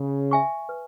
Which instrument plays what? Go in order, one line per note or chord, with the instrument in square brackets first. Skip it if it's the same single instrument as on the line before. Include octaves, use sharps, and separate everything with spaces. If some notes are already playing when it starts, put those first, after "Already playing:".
Already playing: [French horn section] C#3
[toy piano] E5 G#5 C#6
B4